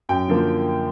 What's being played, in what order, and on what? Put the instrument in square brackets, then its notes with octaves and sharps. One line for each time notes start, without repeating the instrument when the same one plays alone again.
[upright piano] F#2 G5
D3 F3 A#3